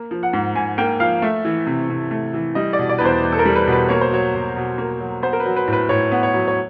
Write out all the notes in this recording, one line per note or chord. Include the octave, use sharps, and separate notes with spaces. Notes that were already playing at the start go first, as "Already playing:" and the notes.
Already playing: A#3
F3
F#5
G#2
G#2 G#5
A#3 G5
F3 F5
A3 E5
E3
C3
C3
A3
E3
G3 D#5
D5
B2
D5
E2 B4
C5
E2
A4
A#4
G3
B4
B2 B4
A#3 C#5
C5
F#3 C#5
B2
B2
A#3
F#3
B3 C5
A#4
B4
F#3
B4
A2
B4
A2 C#5
B3
C#5
F#3
C#5